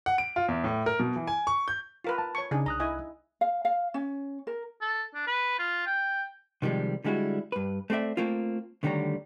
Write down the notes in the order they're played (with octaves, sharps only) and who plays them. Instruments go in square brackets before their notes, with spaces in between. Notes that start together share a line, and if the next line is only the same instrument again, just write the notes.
[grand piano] F#5
D7
F4
E2
A2
A#4
B2
E3
G#5
C#6
G6
[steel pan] F4 A#4 B4
[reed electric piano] A5
[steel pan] C#5 C#6
[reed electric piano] C#3 [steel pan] D4 D#4 G#4
[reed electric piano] C2 D#6 F#6 [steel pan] A#5
[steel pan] E4 D#5 G#5
[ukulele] F5
F5
C#4
A#4
[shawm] A4
D4
B4
F4
G5
[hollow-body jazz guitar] C3 D#3 F3 G3 G#3
D3 G3 G#3 E4 F#4
G2 B4
A3 C4 F#4 D5 E5
A3 A#3 C4 F4
D2 D3 D#3 G3 C#5 A#5